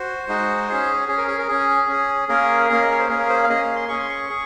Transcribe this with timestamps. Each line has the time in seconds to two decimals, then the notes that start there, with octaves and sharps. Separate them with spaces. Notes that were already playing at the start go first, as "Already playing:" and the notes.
Already playing: F#4 C5
0.28 G#3 D#4 F#4
0.68 C#4 G#4
1.08 C#4 G#4
1.18 A#4
1.28 G#4
1.38 A#4
1.48 C#4 G#4
1.88 C#4 G#4
2.28 A#3 C#4 G#4 A#4
2.69 A#3 C#4 G#4 F5
2.82 D#5
2.91 C#5
2.99 C5
3.09 A#3 C#4 G#4 A#4
3.19 A#4
3.29 C5
3.44 F5
3.49 A#3 C#4 G#4 D#5
3.62 F5
3.76 C6
3.89 C#4 G#4 C#6
3.99 C6
4.09 C#6
4.29 G#4